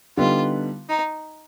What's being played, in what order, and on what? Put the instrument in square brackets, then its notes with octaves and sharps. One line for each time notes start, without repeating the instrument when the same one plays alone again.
[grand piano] D3 G3 B3 D#4 [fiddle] F4
[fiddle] D#4